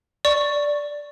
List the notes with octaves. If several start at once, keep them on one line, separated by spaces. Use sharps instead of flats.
D5 C#6